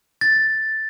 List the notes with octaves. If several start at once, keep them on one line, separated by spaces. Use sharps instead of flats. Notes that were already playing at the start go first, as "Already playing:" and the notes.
A6